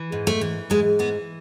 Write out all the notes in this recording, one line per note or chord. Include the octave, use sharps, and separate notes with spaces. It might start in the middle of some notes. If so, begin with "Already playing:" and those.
Already playing: E3
G#2
A3
E3
G#2 G#3
E3 B3